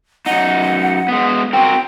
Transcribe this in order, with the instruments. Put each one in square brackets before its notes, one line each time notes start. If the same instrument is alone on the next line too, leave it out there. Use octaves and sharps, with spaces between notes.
[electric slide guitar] F#2 D#4 [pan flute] F#5
[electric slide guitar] G#3 B3
[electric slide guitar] C4 F#4 A#4 [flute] G5